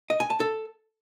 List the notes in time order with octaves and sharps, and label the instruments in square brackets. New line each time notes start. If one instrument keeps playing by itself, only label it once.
[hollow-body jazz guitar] D#5
G#5
A5
A4